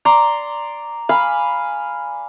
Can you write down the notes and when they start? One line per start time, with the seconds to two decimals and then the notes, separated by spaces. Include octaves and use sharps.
0.05 D5 A#5 C6
1.09 F5 G#5 B5